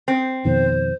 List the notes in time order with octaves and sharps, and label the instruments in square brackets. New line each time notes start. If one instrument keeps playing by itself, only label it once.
[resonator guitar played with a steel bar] C4
[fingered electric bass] F2 B2 D#3 [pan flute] C5